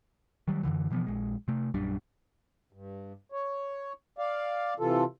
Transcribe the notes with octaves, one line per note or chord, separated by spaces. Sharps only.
D#3 F#3 G3
F#2 A2 D3 E3
B2 E3 F3 B3
A#1 G#3
C3 A3
A#1 F#2 G3 D4
G2
C#5
D5 F5
C3 E3 F4 A4